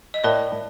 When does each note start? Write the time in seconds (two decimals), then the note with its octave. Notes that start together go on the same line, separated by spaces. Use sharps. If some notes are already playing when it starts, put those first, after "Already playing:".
0.14 D#5
0.24 A2 A#4 D5